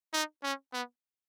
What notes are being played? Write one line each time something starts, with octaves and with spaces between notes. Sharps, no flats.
D#4
C#4
B3